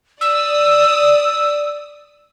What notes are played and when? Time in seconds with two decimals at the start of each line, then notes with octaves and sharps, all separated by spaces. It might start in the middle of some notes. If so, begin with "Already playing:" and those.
0.21 D5 D#6 E6